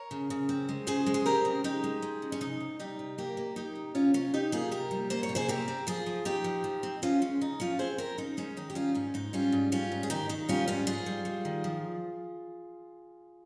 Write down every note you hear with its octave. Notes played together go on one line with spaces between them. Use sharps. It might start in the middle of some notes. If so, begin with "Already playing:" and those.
Already playing: A#4 C#5
C#3
C#3
C4
G#3
C#3 G#4 C5
G#3
G#4
C4 G4 A#4
C#3
G#3 D#4 G4
G#3
G#3
C#3
C#4
C3 D#4
C3
G3 D#4 G4
C3
A#3 G4 A#4
A#3
A#3 D#4 G4
C3
C3 C#4 F4
C3 C#4 F4
C3 D#4 G4
A#3 F4 G#4
C3 G4 A#4
G3
A#3 C5
C#5
C3
G#4 C5
C4 G4 A#4
C4
F3 F4 G#4
F3
F3 D#4 G4
F3
F3
C4
F3 C#4 F4
G#3 C#4
C#3 D#4
F3 C#4 F4
C4 G#4 C5
C4 G4 A#4
C#3 D#4
G#3 C#4
D#3 D#4
G4
G3 C#4 F4
G#2 C#4
G#2 D#4
G3 C#4 F4
G#2
G3 C#4 F4
G#2
G#4
D#3 D#4 G4
D#3 D#4
G3 C#4 F4
G#2 C#4 F4
G#2 F4 G#4
G3
G3
D#3
F3